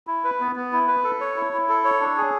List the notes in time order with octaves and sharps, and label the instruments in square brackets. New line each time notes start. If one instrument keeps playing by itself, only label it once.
[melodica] E4
B4
B3
B3
E4
B4
A4
C#5
E4
E4
A4
C#5
D4
G#4